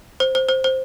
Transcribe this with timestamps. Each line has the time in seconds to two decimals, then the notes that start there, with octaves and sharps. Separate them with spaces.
0.20 C5
0.35 C5
0.49 C5
0.64 C5